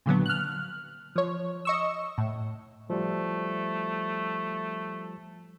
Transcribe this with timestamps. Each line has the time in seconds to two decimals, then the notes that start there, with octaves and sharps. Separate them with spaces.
0.06 A#2 D3 F#3 B3
0.26 F6 F#6
1.16 F3 C#5
1.65 D#5 C#6 E6
2.18 A2
2.90 F3 G3 A3